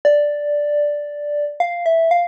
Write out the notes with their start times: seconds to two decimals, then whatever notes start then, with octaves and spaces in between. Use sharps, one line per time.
0.05 D5
1.60 F5
1.86 E5
2.11 F5